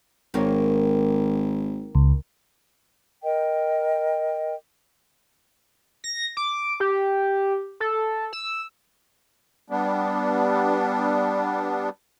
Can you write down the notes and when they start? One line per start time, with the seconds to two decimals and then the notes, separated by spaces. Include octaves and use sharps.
0.34 G#1 D#3 A#3 C#5
1.95 C#2
3.23 A#4 D#5 G5
6.04 A#6
6.37 D6
6.80 G4
7.80 A4
8.33 E6
9.70 G3 B3 D4